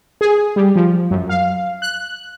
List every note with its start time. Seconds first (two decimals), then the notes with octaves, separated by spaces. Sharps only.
0.21 G#4
0.56 G3
0.76 F3
1.10 F#2
1.29 F5
1.82 F#6